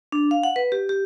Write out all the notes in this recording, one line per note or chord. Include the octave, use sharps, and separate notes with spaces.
D4
F5
F#5
B4
G4
G4